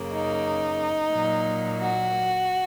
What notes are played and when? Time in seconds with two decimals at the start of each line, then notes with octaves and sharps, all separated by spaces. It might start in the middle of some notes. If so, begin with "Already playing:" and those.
Already playing: F#2 C#3 A#3
0.12 D#4
1.12 A#2 F#3 A#3
1.78 F#4